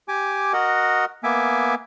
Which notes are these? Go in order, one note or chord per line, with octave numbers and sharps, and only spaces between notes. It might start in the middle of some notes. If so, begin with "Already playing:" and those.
G4 G#5 D6
F#4 A#4 D#5 F#5
A#3 B3 E5 G#5 D6